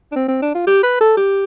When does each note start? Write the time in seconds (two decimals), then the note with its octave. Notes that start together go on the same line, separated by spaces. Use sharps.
0.12 D4
0.16 C4
0.28 C4
0.42 D4
0.55 F4
0.67 G4
0.83 B4
1.01 A4
1.17 G4